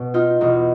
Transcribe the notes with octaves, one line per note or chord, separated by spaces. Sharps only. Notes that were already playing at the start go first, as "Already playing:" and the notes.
Already playing: B2
D#4 F4
E2 B2 D#4